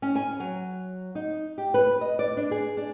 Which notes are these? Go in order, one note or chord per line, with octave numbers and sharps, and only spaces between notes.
C#4
G#5
F#3
D#4
G4
B4
D#5
D5
D4
G#4
D4